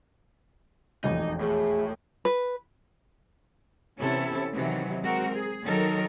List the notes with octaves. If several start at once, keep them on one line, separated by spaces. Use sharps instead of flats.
E1 A1 F2 D#4
A2 G#4
B4
C3 E3 B3 C#4 E4 A4
C3 D#3 E3 F#3
G#3 C4 F#4 A#4
G#4
D#3 F#3 D#4 A4 A#4